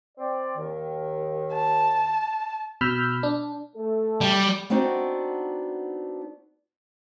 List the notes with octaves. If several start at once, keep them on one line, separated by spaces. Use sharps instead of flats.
C4 D5
D#2 D#3
A5
B2 B5 E6 F6 G6
D4
A3 A4
G3
B3 C4 D4 D#4 F#4